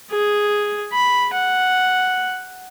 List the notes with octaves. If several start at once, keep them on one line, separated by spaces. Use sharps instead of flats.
G#4
B5
F#5